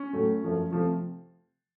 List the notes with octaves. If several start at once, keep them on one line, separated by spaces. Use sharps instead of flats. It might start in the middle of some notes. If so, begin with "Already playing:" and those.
Already playing: C#4
A2 F#3 A3
F#2 F3 A3
C3 F3 A3